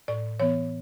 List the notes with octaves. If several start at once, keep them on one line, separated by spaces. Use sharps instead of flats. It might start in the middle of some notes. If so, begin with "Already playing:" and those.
A2 D5
E3 B3 C#5